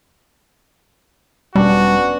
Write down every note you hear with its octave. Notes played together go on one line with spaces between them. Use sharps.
E1 G3 B3 C#4 D4 F#4